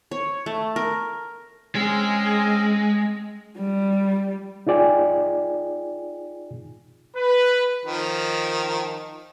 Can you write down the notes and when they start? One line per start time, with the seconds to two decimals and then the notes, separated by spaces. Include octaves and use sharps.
0.11 C#5
0.46 A3
0.76 A#4
1.75 G#3 C4 C#4 G#4
3.57 G3
4.67 D#4 F4 G#4 D5 G5 G#5
7.16 B4
7.85 D#3 F3